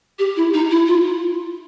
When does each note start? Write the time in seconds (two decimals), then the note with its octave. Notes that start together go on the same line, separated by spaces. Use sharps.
0.19 G4
0.37 E4
0.54 D#4
0.71 E4
0.88 F4